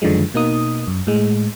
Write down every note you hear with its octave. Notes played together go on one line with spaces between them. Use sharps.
F#2 D3 D#3 F3 G#3
B2 A#3 D#4 D#6
F#2
A2 G#3